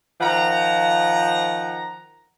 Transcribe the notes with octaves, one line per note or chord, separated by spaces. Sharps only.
D#3 F3 F#5 A#5